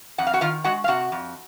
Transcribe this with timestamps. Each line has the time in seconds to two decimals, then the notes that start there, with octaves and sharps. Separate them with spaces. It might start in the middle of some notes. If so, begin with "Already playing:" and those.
0.18 F2 F#5
0.27 F5
0.34 F#4 F#5
0.41 D#3 F4 F5
0.64 G#3 F#4 F#5
0.84 F5
0.88 C3 F#4 F#5
1.12 F2